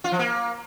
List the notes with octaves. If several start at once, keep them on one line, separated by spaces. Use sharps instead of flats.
F4
F3
A#3